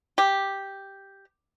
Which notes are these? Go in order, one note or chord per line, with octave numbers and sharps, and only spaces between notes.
G4